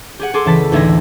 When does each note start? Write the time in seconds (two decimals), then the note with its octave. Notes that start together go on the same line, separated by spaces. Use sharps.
0.19 G4 G#4 F#5
0.34 G#4 A4 C6 D6
0.46 C#2 E3 A5 A6 B6
0.72 A1 D2 D#4 E5 G#6 A#6